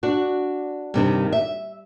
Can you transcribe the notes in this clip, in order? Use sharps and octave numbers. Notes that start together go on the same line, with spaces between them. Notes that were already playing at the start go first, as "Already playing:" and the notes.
D4 F#4
G2 C3 D#3
E5